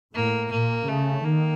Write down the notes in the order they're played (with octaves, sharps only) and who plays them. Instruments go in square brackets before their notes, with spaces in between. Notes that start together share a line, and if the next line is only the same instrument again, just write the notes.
[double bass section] A2 [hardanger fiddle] A#3
[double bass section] A#2 [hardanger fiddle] A#3
[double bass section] C#3 [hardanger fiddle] A3
[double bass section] D#3 [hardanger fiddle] A#3